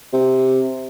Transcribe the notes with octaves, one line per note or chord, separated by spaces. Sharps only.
C3